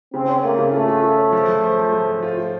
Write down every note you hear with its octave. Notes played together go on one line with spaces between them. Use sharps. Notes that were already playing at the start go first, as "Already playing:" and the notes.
C#3 C4
C#4
A3 A#3
C#3
A3 F4
F4
F4
C#4
F3
F3
C5
F3
F3
C4
F4
F4